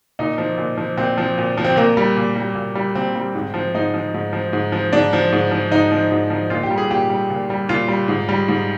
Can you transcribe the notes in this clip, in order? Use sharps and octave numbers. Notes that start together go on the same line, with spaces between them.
A#2 D#4
F3
A#2
F3
A#2 C4
F3
A#2
F3
C4
A#2 A#3
G3
A#2
G3
A#2
G3
A#2 C4
G3
G#2
F3
G#2 D#4
F3
G#2
F3
G#2
F3
G#2 D4
F3
G#2
F3
G#2 D#4
F3
G#2
F3
A#2 F4
G4
G3
G#4
A#2 G4
G3
A#2
G3
A#2 F4
G3
G#2
G3
G#2